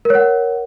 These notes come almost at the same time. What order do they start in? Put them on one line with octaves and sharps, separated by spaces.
A#4 C#5 F#5